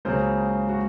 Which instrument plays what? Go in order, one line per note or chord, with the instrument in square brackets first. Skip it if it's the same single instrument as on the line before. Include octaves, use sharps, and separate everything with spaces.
[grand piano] C#2 C#3 F#3 A#3 C5
F#4